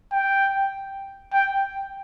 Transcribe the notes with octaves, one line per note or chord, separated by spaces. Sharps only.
G5
G5